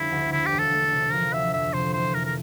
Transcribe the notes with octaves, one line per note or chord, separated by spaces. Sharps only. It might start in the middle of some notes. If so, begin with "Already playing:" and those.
Already playing: F1 D3 G3 E4
D2
D3 E4
G4
E1
A4
A3
C3
F3 A#4
D2 E5
F2 E5
C3 C5
E3 C5
F2 A#4
A#4